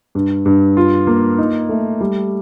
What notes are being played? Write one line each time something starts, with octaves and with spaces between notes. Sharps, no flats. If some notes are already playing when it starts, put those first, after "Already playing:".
G2
G2
F4
A#3
D#4
A3
G3